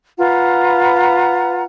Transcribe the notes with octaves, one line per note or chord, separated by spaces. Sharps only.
F4 B4 F#5 A#5